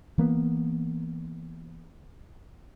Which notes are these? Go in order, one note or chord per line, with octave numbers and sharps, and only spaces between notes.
E3 A#3 B3